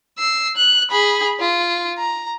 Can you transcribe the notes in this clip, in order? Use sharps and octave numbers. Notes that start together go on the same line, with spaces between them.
E6 C7
F#6
G#4 B5
F4
A#5